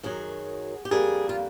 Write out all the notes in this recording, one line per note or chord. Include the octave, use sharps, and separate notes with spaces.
F#2 D#3 F#3 G#4
G4
F2 D3 G3 A#3 G#4
F4